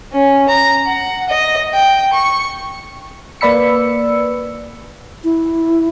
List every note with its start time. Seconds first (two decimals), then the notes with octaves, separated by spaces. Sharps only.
0.12 C#4
0.48 A#5
0.86 F#5
1.29 D#5
1.73 G5
2.13 C#6
3.41 A#3 B4 D5 B5 E6 C#7
5.24 E4